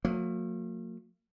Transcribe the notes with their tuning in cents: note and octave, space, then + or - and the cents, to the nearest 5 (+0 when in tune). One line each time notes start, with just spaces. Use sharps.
F#3 -45 A#3 -40